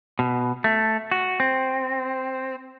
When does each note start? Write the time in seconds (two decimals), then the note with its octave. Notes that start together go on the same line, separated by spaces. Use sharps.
0.19 B2
0.64 A3
1.11 F#4
1.40 C4